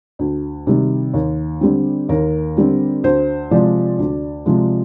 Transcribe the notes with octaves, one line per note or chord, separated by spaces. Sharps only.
D2
C3 D#3 G3
D#2
D3 G3 C4
D#2 A#4
D3 G3 C4
D2 C5
C3 F3 G#3 D5
D2
C3 F3 G#3